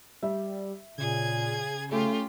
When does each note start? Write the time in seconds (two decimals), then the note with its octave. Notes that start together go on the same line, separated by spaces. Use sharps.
0.23 G3 E5
0.98 A#2 C#3 G#4 G#6
1.92 A3 C#4 F4 G4